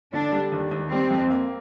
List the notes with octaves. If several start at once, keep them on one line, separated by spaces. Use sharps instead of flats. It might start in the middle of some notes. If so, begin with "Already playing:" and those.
D3 D4
G3
D#2
D#2
G3 C4
F2
A#3